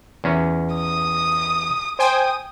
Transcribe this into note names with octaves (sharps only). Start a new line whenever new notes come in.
E2 C#4
D#6
C5 G5 G#5 D#6